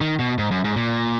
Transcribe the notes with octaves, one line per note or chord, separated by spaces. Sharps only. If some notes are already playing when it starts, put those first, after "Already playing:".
D#3
B2
G#2
F#2
G#2
A#2